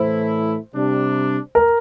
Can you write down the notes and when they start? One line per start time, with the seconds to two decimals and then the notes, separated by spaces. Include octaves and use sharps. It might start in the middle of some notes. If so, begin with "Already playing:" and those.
Already playing: A2 E3 A3 E4 C5
0.73 C3 G3 D4
1.55 A#4